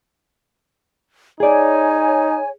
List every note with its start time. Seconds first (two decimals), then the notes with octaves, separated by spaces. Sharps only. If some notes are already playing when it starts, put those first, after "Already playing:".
1.40 D#4 G#4 C#5 D5 G#5